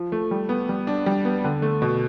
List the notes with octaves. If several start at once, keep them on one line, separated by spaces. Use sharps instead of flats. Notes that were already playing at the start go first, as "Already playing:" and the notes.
Already playing: F3
A3
G3
B3
G3
D4
G3
B3
D3
A3
B2